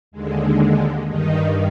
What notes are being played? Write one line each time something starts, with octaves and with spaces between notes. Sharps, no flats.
D#2 D3 G#3
G2 D#3 D#4